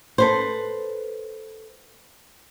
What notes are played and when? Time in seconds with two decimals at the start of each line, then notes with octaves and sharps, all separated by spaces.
0.18 A4 B4 C5